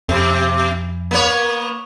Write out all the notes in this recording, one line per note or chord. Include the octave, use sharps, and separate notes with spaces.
F2 B2
A#3 B3 C#5